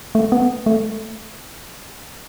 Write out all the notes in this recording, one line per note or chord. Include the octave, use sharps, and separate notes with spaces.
A3
B3
A3